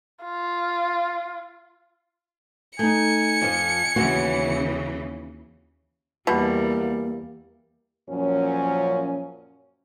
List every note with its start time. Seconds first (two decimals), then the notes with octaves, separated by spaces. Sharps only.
0.24 F4
2.79 A3 D#4 G#5 C#7
3.42 F2 F3
3.96 D#2 C#3 E3 C4 C#4 F#4
6.27 E2 B2 G3 A#3
8.09 F#2 A#2 F3 C#4